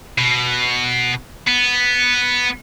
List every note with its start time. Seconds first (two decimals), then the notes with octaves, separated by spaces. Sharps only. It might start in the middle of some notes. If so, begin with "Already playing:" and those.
0.19 B2
1.47 B3